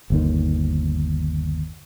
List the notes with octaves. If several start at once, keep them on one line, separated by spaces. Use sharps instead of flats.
G1 D#2 D#3